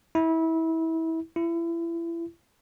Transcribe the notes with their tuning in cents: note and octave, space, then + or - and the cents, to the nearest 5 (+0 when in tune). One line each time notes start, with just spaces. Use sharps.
E4 -25
E4 +30